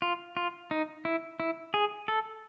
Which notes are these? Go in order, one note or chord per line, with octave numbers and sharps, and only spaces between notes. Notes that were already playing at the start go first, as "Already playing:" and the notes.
F4
F4
D#4
E4
E4
G#4
A4